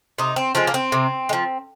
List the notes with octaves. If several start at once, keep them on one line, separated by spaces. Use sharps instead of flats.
C3 D#4
C4
F3 G#3 C4
A#3
C4
C3
G#3
F3